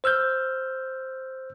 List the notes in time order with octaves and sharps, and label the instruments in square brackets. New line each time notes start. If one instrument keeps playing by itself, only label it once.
[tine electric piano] C5 E6 F6 G6